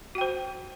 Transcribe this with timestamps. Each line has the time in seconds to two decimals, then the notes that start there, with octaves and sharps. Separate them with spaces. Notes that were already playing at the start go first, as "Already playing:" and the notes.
0.15 F#4
0.18 G5
0.21 C5